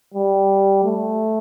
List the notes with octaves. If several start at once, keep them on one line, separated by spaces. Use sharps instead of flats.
G3
A3